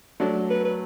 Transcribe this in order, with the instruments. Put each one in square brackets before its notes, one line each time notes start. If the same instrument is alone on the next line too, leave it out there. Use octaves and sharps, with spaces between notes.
[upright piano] F#3 A3 [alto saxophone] D4
[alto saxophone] B4
B4